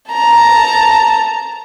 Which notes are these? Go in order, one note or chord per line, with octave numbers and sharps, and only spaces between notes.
A5 A#5